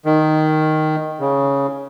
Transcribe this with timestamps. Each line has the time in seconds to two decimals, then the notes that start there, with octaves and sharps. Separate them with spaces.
0.06 D#3
1.20 C#3